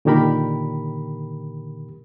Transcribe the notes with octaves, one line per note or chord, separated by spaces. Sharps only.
A#2 D3 D#3 G4 A#4 B5